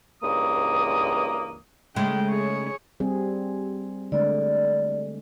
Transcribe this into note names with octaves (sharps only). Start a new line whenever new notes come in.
C#2 G2 E3 A#3 D#6
C#3 G#3 A3 G5
G#4 C#5
G3 C4 G#4
D3 G#3 A3 D5